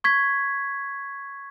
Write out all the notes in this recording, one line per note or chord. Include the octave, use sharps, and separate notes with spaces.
C#6 G#6 B6